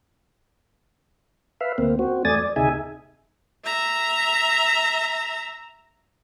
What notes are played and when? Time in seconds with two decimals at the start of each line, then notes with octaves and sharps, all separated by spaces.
1.61 B4 E5 F5
1.78 D2 A#3 C4
1.99 C4 F#4
2.25 E2 A3 D5 G#5 D#6 A6
2.38 D5
2.56 D2 C3 D#4 G#4 E5 G#5
3.65 E5 A#5